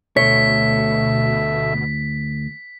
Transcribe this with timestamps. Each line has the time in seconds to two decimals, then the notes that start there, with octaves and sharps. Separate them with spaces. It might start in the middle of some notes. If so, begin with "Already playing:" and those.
0.17 D2 B2 A3 C#5 E5 B6